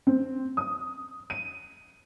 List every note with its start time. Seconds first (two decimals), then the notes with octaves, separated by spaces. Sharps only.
0.07 C4
0.57 D#6
1.30 D#7